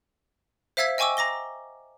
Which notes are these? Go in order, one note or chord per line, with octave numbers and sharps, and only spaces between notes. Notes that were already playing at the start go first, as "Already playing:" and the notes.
C5 E5 F5 E6 G#6 B6
D#5 G5 G#5 C#6 D6 E6
A#5 D6 A#6 G7